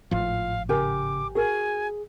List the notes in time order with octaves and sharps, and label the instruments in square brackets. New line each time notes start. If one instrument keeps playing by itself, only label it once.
[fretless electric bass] G#1 A2 F3 [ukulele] F4 [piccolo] F5
[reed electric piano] C#3 [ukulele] G4 A#4 G#5 [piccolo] D6
[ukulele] F#4 A#4 [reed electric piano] G#4 [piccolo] G#5